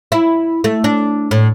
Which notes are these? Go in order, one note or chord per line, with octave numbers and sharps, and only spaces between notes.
E4
A3
D4
A2